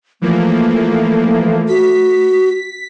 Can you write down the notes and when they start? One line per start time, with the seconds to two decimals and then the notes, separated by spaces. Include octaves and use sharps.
0.22 E3 F3 A3 A#3
1.69 F#4 B6